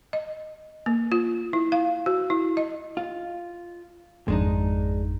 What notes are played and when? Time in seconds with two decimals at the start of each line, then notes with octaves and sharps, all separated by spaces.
0.13 D#5
0.86 A#3
1.12 F4
1.53 E4
1.72 F5
2.06 F#4
2.30 E4
2.57 D#5
2.97 F4
4.28 G#1 F2 G#3 D4 D#4